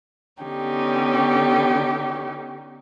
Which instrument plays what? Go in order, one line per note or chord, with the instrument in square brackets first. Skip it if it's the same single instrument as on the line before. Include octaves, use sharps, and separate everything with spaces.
[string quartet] D3 B3 C#4 D#4 G4